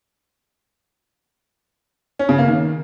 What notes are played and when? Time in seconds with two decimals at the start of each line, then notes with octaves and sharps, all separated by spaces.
2.19 C#4
2.29 C#3
2.38 A#3
2.48 D#3